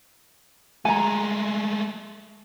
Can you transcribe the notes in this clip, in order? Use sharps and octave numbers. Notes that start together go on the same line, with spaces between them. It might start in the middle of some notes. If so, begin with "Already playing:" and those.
G#3 A3 G#5 A#5